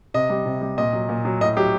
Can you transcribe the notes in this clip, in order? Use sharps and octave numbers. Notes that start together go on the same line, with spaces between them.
C3 D#5
G3
C3
G3
A#2 D#5
F#3
A#2
F#3
A2 D#5
F#3 G4